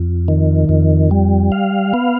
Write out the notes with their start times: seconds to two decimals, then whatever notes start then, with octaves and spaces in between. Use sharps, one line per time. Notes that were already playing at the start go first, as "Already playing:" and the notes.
Already playing: F2
0.28 D#3
0.69 F2
1.11 G3
1.52 F5
1.94 B3